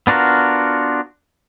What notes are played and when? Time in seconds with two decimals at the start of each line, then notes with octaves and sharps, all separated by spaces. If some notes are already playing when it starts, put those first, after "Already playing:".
0.07 B3 D4 F4 F#4 A#4